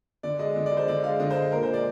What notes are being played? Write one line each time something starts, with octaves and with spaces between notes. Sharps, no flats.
D3 D5
G#3 D#5
D3
D5
G#3
C5
D3 D5
G#3 F5
D3 D#5
C5
G#3
A#2 A#4
C5
G#3
D5